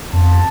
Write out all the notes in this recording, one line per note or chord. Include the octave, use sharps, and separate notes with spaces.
F2 A5